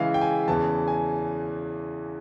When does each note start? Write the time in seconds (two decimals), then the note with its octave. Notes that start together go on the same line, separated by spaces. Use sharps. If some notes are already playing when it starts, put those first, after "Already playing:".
Already playing: C#3 E3 G#3 E5 F5
0.14 G5
0.21 G#5
0.48 E2 C#3 E3 A5
0.88 G#5